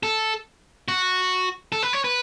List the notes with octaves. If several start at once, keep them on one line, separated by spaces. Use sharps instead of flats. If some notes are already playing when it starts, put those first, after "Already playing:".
A4
F#4
A4
B4
C#5
B4